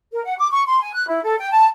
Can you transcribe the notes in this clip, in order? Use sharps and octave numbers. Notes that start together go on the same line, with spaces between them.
A#4
F#5
D6
C#6
C6
G#5
F#6
E4
A4
G5
A5